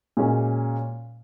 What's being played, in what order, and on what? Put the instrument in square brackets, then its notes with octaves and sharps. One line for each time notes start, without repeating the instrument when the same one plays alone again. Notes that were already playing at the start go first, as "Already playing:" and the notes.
[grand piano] A#2 G#3 C#4 F#4